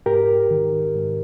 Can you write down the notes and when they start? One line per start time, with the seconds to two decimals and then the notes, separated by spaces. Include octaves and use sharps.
0.06 G#2 G4 A#4
0.51 D#3
0.96 G#2